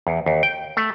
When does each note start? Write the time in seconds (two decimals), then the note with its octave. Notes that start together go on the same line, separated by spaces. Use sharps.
0.07 E2
0.26 D#2
0.43 G5
0.77 A3